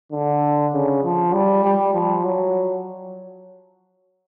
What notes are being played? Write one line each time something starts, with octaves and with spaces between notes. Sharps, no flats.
D3
C#3
F3
G3
G3
F3
F#3